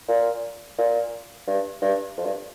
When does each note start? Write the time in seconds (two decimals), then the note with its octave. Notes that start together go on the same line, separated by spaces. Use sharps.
0.09 A#2
0.78 A#2
1.47 G2
1.82 G2
2.18 F2
2.25 G2